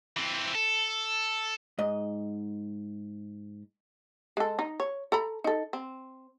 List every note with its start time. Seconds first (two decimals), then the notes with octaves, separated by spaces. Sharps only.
0.17 E3 C4
0.55 A4
1.79 G#2 D#5
4.37 G#3 A4
4.59 D#4
4.80 C#5
5.12 A4 A#5 B5
5.44 D#4 A4
5.73 C4